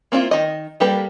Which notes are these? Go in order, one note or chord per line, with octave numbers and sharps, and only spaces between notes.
A#3 C4 D4 E4 F4
D#3 D#5
G3 A#3 G4 A4 B4